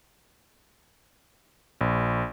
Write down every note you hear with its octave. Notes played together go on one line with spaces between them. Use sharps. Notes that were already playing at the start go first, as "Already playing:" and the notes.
A#1